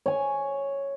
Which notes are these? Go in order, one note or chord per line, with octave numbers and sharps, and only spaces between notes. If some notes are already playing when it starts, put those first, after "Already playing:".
C#5 G#5